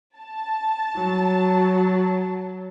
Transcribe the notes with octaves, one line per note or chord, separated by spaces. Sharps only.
A5
F#3